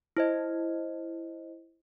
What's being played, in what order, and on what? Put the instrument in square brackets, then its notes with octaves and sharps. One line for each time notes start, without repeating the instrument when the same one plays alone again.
[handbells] E4 C5 D#5